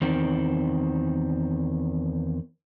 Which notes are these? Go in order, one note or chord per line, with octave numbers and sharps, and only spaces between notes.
E2 D#3 C4